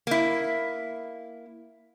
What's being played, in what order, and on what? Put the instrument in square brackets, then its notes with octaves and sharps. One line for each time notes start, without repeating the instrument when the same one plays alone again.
[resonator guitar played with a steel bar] A#3 E4